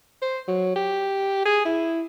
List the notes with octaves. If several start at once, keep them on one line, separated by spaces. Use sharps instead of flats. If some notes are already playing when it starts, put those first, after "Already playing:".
C5
F#3
G4
G#4
E4